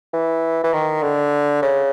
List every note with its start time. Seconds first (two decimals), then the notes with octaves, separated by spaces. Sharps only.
0.13 E3
0.64 E3
0.73 D#3
1.03 D3
1.62 C#3